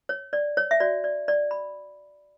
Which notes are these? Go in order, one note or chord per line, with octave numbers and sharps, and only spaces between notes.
C#5
D5
C#5
E5
F#4 C#5 D5
D5
D5
B5